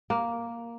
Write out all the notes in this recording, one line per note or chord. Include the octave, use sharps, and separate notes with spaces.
A#3